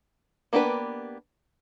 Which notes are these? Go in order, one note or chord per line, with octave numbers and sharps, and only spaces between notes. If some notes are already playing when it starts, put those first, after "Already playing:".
A#3 B3 D4 G4 B4